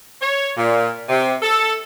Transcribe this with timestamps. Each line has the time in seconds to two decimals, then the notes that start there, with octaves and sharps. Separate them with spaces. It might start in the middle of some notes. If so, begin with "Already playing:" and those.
0.22 C#5
0.57 A#2
1.09 C3
1.42 A4